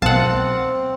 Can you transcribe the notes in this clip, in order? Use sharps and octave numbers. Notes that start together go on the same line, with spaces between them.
B1 C4 F5 F#5 A5